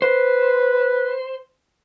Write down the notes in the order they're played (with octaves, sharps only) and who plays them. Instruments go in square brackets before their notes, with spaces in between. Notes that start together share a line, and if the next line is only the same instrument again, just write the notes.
[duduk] B4 [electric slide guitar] C5